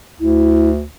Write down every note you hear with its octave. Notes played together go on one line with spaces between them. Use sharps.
D2 E4